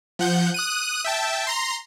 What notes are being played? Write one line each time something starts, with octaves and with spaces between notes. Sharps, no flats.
F3 F#5 G6
D#6 F#6 D#7
E5 G5 A5
A#5 C6